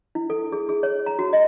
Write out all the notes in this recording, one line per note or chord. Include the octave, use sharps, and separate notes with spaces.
E4
A4
G#4
G#4
C#5
A#5
F#4
D#5